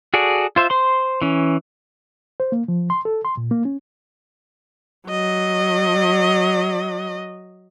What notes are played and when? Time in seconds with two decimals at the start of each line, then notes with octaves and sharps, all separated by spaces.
0.14 F#4 G#4 A4 D5
0.56 F4 C5 E5
0.70 C5 C6
1.22 E3 C#4
2.40 C5
2.52 A#3
2.68 F3
2.90 C6
3.05 A4
3.25 C6
3.37 A#2
3.51 A#3
3.65 C#4
5.08 F#3 D#5